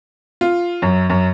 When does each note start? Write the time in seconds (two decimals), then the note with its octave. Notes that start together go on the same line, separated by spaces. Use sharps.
0.41 F4
0.82 F#2
1.10 F#2